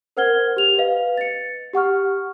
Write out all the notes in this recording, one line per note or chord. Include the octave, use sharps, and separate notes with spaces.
A#4 C5 F#5 F6 G#6 G7
G4 F7
B4 D#5 F5
A6 C#7
G4 F#5 C#6 F6